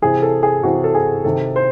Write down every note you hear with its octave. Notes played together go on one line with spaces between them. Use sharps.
C3 E3 G#4
A4
G#4
C3 E3 F#4
A4
G#4
C3 D#3 A4
C5